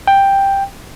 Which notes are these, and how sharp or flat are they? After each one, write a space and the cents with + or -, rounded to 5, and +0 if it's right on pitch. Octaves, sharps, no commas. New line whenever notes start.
G5 +5